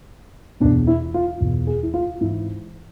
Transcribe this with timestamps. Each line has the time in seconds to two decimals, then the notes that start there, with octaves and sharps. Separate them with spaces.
0.60 E2 B2 D4
0.87 E4
1.14 F4
1.40 E2 B2
1.67 G#4
1.83 E4
1.94 F4
2.21 G#2 E3 E4